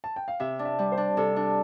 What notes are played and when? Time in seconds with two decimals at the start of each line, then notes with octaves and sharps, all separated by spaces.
0.04 A5
0.16 G5
0.28 F5
0.40 C3 E5
0.59 D4
0.65 E5
0.79 G3
0.92 C5
0.97 D4
1.17 C3 A4
1.36 D4